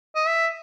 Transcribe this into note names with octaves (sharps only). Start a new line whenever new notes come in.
D#5
E5